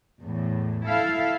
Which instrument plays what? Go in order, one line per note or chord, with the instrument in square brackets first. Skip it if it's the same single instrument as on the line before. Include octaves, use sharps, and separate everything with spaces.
[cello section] E2 A2
E4 A4 E5 F5